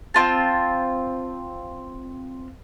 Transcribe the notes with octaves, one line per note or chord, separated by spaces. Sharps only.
C4 F4 A5